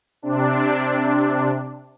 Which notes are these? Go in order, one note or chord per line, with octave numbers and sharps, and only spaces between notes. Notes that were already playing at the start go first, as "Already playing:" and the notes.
C3 D4